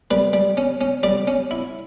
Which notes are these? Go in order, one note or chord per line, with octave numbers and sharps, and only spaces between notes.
G3 B4
G3
C#4
C#4
G3 D5
C#4
E4